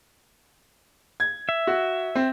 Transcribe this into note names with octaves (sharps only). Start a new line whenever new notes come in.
G#6
E5
F#4
C4